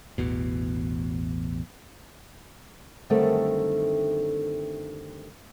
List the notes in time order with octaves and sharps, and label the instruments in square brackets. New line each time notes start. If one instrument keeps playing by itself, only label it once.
[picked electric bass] A1 E2 B2
[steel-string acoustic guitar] F#2 D3 D#3 G3 A3 C4